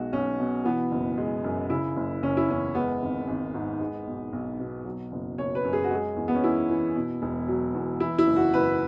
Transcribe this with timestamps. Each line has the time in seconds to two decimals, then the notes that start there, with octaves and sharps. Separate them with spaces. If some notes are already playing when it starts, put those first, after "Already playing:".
Already playing: B1 G#3 F#4
0.13 B1 C#4
0.39 B2
0.65 E3 B3
0.91 F#1
1.18 G#3
1.44 F#2
1.69 C#3 E4
1.96 F#1
2.23 F#1 C#4
2.37 E4
2.48 E2 C#4
2.75 G#3 B3
3.02 G#1
3.27 G#1
3.54 G#2
3.80 G#3
4.07 B1
4.33 B1
4.59 B2
4.85 F#3
5.12 F#1
5.38 F#1 C#5
5.55 B4
5.64 F#2
5.73 G#4
5.84 F#4
5.91 G#3 G#4
6.16 E2
6.28 B3
6.35 C#4
6.44 E2 E4
6.70 E3
6.96 B2
7.22 E1
7.48 F#3
7.74 E2
8.00 E3 E4
8.18 E4
8.27 F#1
8.36 F#4
8.54 F#1 B4